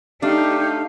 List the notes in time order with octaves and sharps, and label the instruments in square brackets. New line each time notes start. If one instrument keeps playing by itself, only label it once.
[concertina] A3 F5 [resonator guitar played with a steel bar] D4 [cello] D#4 [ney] G4